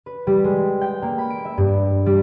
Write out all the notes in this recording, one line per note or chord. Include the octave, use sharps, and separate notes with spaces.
B4
G3
G#3
G5
A#3
B5
D7
E5
G2
G3